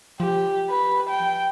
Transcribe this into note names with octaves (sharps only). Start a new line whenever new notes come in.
F3 G4
B4
G5